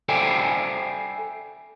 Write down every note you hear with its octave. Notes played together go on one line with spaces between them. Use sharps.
A4 C5 D5 E5 G5 G#5